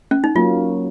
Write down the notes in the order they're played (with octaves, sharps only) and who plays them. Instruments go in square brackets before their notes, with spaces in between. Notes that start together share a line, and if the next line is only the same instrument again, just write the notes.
[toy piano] C#4
D#4
[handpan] F#3 A#3 C#4 [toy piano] F4